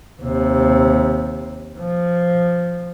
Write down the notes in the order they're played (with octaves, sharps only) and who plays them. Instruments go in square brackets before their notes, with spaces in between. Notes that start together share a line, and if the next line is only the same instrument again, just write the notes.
[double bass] D#2 C3
F3